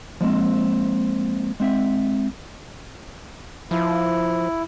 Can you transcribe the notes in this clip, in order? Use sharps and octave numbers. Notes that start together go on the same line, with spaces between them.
F3 G#3 A#3 C4
G#3 C4 E5
F3 E4